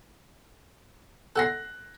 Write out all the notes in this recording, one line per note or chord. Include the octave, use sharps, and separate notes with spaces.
A4 F#5 C6 F#6 A#6